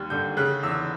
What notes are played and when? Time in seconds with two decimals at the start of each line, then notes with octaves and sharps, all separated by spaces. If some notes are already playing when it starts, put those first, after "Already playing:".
Already playing: D#2 G3
0.10 D3 G6
0.37 C#3 F#6
0.63 E2 E6